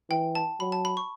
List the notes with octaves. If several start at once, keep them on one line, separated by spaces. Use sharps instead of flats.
E3 G5
A5
F#3 B5
A5
B5
C#6